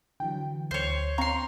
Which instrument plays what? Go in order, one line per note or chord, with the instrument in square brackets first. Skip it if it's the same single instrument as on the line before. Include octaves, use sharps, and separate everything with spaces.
[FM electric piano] D3 E3 F#3 [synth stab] G5
[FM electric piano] D2 [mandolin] C5 C#5
[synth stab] C4 F5 C#6 [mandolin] A#5 C6